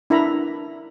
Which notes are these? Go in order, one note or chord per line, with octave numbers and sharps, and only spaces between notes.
D4 E4 A#4 E5 A#5 B5